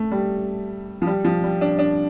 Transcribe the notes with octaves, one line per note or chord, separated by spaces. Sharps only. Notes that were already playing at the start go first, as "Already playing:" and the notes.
Already playing: A3
G3
F3
G3
F3
G3
D4
D4